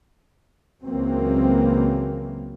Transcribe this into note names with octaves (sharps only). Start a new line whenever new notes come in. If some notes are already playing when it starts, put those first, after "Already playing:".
C#2 C#3 E3 F#3 A#3 C4